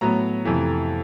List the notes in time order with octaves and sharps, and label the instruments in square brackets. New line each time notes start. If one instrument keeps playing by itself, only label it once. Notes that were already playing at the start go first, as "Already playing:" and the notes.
[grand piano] A2 F#3 B3 A#5
F2 C3 E3 A3